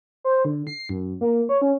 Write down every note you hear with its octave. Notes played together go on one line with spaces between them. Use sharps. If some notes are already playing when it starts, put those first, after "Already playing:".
C5
D3
C7
F#2
A#3
C#5
C#4